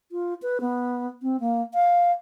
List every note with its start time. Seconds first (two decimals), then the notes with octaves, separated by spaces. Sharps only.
0.12 F4
0.42 B4
0.61 B3
1.22 C4
1.40 A#3
1.74 F5